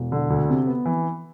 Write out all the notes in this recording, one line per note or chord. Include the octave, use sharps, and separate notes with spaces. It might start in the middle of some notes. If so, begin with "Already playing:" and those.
Already playing: E1
D3
D2
C3
B3
E3